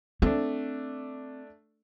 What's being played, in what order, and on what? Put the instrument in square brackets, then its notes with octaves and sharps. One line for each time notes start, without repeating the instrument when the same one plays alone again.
[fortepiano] A3 D4 [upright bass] C4